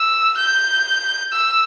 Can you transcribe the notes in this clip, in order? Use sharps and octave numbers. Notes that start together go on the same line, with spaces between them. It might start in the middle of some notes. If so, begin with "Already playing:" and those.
Already playing: E6
G6
E6